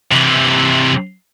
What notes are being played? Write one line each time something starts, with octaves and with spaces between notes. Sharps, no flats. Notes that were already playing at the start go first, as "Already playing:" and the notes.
C3 E3